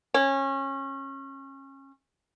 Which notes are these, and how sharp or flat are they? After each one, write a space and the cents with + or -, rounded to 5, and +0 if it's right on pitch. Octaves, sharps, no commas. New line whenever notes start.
C#4 -25